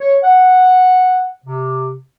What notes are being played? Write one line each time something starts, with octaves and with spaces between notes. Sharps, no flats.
C#5
F#5
C3